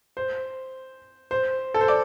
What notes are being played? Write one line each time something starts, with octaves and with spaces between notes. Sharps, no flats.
C5
C5
A4
C5
D5